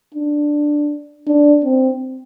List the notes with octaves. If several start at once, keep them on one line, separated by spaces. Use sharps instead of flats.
D4
D4
C4